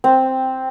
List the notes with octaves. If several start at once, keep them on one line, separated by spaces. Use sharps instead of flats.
C4